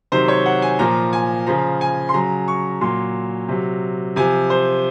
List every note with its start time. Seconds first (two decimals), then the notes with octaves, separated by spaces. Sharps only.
0.12 C3 D#3 F#3 C5
0.28 C#5
0.46 F#5
0.62 G#5
0.79 A#2 F3 A#5
1.13 G#5
1.47 C#3 F3 A#5
1.81 G#5
2.09 C6
2.14 C#3 F#3 A#5
2.48 C#6
2.81 A#2 F#3 C6
3.48 C3 F#3
4.16 C3 F3 G#5
4.50 C5